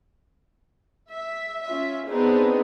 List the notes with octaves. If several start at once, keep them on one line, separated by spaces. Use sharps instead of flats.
E5
C#4 F4 E5
B3 C4 D4 D#4 G#4